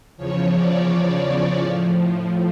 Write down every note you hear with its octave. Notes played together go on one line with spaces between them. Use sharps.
E2 C#3 F3 C#5
D5
C#5
A2 F3